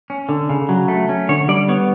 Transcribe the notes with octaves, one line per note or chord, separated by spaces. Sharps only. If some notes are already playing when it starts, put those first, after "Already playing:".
C#4
D3
C#3
F#3
A3
C#4
D3 C#5
G3 D5
B3 C#5